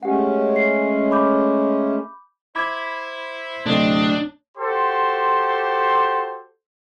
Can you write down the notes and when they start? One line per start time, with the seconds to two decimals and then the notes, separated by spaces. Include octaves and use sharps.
0.03 G#3 A3 C#4 G4 F#5
0.56 C7
1.11 B5 D6 G6
2.56 E4 C5 B5 D6 G#6
3.66 D1 C3 A3 C4 D4 D#5
4.58 F#4 G4 A4 C5 C6